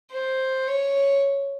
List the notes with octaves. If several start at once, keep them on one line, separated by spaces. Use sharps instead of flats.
C5
C#5